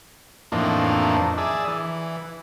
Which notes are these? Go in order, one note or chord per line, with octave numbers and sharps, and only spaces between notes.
F2 A2 E3 A#3 D4 D#4
G#4 D5 E5
E3